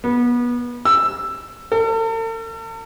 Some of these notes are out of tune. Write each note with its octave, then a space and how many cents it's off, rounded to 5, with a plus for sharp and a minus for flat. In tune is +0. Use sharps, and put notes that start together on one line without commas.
B3 -25
E6 +10
A4 +45